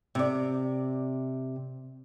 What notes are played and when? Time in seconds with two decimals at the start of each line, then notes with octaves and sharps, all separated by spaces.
0.15 C3 D5